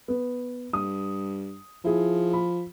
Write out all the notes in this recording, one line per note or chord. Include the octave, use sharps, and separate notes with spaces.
B3
G2 D#6
F3 E4 G#4
B5